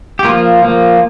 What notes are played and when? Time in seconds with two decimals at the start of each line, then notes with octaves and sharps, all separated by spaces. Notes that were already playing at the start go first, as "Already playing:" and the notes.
0.19 G4
0.25 F3 A#3 F4
0.62 F3 A#3